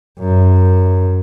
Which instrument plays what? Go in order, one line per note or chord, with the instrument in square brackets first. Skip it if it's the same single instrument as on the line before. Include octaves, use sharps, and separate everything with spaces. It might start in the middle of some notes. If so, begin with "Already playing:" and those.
[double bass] F#2